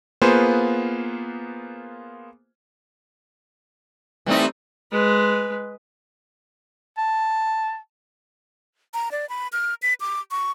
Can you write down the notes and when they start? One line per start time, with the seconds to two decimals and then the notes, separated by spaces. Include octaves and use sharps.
0.22 A#3 B3 F4 G#4 B4 C5
4.26 E3 G3 A3 C4 D#4
4.92 G#3 B4
6.97 A5
8.94 A#5
9.12 D5
9.29 B5
9.53 F6
9.82 B6
10.00 D6
10.31 C#6